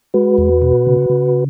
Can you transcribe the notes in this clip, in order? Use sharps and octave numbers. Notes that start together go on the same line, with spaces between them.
G#3 F#4 B4
E2
B2
C#3
C#3